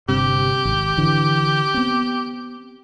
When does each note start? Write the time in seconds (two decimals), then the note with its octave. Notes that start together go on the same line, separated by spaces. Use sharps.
0.09 G1 G2 C3 G4
0.65 G#1
0.97 D3 E3
1.74 B3 C4